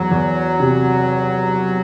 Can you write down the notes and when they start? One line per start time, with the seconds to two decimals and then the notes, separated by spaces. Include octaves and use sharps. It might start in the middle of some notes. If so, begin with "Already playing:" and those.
Already playing: E2 F#3
0.11 E2
0.60 C3